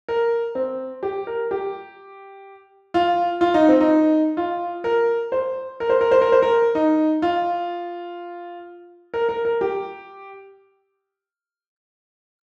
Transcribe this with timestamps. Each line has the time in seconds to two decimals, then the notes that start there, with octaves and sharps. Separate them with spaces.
0.08 A#4
0.55 C4
1.03 G4
1.27 A#4
1.51 G4
2.94 F4
3.41 F4
3.54 D#4
3.69 C4
3.81 D#4
4.37 F4
4.84 A#4
5.32 C5
5.80 A#4
5.90 C5
6.01 A#4
6.11 C5
6.21 A#4
6.32 C5
6.42 A#4
6.75 D#4
7.22 F4
9.14 A#4
9.29 A#4
9.45 A#4
9.61 G4